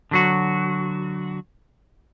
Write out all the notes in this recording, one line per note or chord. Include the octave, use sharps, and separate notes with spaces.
D3 F#3 F#4